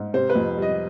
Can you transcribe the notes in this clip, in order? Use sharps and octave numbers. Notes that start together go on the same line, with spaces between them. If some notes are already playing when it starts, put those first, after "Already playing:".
Already playing: G#2
C3 C5
B4
F2
G3
D#5